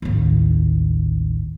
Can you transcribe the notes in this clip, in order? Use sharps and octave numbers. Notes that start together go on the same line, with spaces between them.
A1 D#2